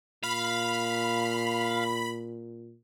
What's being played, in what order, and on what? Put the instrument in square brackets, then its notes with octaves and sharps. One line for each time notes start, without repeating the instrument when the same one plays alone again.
[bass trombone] A#2 [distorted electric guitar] F5 [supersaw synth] B5